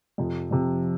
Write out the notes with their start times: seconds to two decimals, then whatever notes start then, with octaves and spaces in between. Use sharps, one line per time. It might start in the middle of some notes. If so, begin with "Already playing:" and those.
0.18 F2 C3 F3
0.51 F2 C3 F3